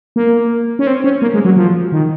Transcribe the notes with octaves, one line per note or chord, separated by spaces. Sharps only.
A#3
C#4
C4
C#4
A#3
G#3
F#3
F3
D#3